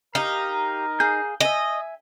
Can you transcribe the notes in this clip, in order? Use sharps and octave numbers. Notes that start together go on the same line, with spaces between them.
D#4 G4 A#4 F5
G#4 F5 G6
D#5 E5 G#5